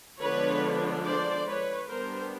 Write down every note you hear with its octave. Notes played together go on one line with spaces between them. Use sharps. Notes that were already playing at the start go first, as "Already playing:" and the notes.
D3 F3 G#3 B3 D4 B4 C#5
C5 D5
B4 C#5
G3 B3 D4 A#4 C5